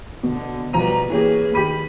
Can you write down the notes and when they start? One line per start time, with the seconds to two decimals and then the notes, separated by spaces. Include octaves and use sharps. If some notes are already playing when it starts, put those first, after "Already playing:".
0.23 B2 D3
0.73 B2 F3 G3 B4 A#5 D#7
1.10 E3 A#3 C#4 G4 G#4 B4
1.55 D#3 G4 B5 D#7